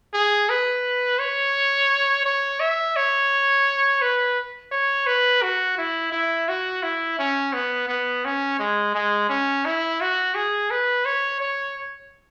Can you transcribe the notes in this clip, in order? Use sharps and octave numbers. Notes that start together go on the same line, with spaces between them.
G#4
B4
C#5
C#5
E5
C#5
B4
C#5
B4
F#4
E4
E4
F#4
E4
C#4
B3
B3
C#4
G#3
G#3
C#4
E4
F#4
G#4
B4
C#5
C#5